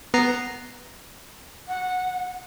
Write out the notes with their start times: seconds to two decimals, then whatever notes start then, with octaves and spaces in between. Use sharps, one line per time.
0.14 B3 A#5 C7
1.68 F#5